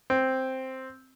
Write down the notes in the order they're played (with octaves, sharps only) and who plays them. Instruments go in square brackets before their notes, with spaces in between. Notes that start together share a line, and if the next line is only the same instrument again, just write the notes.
[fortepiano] C4